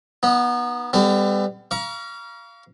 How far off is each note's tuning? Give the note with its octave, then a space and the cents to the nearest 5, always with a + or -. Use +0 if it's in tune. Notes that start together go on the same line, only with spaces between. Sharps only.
B3 -20 D#4 +0
G3 +30 B3 +40 A4 +10
F5 -20 A#5 +35 C#6 +40